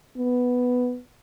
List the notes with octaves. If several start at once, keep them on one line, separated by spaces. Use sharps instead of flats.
B3